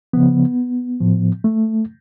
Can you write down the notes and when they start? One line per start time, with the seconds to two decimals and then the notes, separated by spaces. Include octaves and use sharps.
0.13 C#3 F3 B3
1.01 A2 F3
1.44 A3